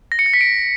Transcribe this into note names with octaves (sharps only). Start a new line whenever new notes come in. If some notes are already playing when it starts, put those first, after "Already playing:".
A#6
C#7
A#6
B6
D7